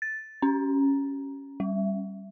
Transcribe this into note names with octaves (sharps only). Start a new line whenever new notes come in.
A6
C#4
G3